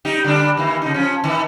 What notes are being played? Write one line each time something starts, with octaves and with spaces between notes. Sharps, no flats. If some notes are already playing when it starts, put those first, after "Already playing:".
G3 D#4 G4
D3 G3 D4
D#3 E3 A#3
C#3 D#4
F3 C#4
D#3 E3